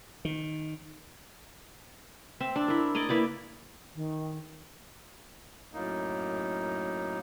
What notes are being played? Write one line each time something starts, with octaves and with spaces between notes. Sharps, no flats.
D#3
C4 E5
D4
E4 A#4
D5 D#5 G#5 A#5
A#3 E4 B4 D5
D#3
F#2 A2 A#3 D#4